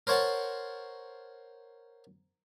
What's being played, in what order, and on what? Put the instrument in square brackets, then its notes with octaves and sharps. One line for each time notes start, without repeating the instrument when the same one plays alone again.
[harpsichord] A#4 C5 C#5 F#5 A5